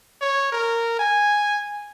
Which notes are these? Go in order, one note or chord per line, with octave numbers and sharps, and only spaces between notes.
C#5
A#4
G#5